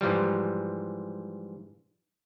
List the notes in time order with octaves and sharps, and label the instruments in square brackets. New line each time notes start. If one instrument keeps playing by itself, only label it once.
[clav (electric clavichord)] G#2 E3 F3 G3